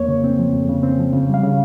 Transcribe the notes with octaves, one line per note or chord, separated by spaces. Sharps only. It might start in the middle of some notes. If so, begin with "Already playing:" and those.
Already playing: F2 A#3 C#5
C#3
C4
F3
F2
C#3
C4
F3
C#3
G3 F5
C#3